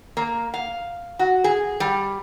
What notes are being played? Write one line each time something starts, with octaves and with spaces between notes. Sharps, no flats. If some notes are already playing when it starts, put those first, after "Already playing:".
A#3
F5
F#4
G#4
G3